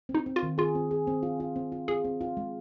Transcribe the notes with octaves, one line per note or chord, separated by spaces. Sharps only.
C4
D#4
C4
F4
D#3
F4 G#4
C4
G#4
C4
F4
F4
C4
F4
F4 G#4
C4
F4
G#3